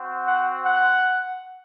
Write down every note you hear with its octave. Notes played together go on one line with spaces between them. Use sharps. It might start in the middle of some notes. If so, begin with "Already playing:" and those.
Already playing: C4 F#4
F#5
F#5